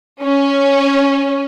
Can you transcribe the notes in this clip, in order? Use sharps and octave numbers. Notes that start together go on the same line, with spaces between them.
C#4